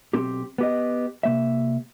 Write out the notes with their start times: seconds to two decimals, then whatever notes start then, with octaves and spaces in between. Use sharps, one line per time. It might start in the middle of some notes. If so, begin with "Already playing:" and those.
0.13 B1 C4 G4
0.58 B3 G4 D#5
1.23 C3 A#3 E5